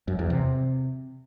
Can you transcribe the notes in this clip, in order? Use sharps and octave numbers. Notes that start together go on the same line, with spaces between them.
F#2
E2
C3